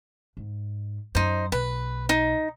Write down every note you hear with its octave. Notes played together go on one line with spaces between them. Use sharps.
G#2
F#2 D#4 C5
B1 B4
D#4